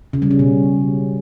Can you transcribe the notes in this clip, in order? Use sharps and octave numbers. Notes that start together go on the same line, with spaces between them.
C#3
G3
C#4
B2